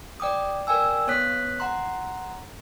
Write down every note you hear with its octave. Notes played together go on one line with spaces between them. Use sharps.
D5 G5 D6 D#6
A#4 D5 G5 G#5 E6
B3 C#5 D#6 F#6 B6
F#5 A#5 C6